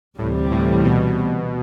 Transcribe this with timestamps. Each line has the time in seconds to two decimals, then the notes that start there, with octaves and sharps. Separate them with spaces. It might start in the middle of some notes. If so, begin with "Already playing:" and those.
0.18 D2 A2 C3 E3 G3
0.51 A2
0.84 B2